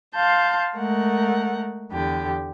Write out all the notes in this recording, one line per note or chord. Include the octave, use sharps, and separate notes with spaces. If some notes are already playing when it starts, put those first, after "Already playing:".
F5 A5 C6 G6
G#3 A3 A#4 F#5
E2 D3 G4